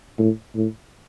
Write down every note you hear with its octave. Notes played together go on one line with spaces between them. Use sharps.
A2
A2